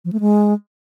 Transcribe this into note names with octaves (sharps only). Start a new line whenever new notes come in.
F3
A3
G#3